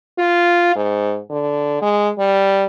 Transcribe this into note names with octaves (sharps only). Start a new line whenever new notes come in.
F4
G#2
D3
G#3
G3